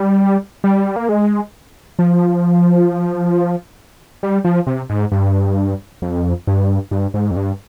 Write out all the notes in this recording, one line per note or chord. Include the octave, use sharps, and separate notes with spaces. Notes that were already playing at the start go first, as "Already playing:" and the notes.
Already playing: G3
G3
A#3
G#3
F3
G3
F3
C3
G#2
G2
F2
G2
G2
G#2
F2
G2